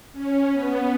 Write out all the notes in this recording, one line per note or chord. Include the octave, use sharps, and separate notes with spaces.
C#4
B3